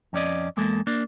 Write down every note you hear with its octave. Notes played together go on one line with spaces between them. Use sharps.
F2 C#4 D5 D#5
E2 G#3 A#3 A4
A#3 D4